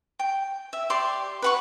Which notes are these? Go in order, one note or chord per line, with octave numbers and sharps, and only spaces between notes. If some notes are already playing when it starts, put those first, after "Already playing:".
G5
E5
G4 D5 C6 D6
B4 F#5 C#6